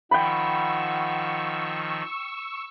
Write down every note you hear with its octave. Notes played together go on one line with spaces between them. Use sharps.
D#3 F3 F#5 G5 B5 C#6 E6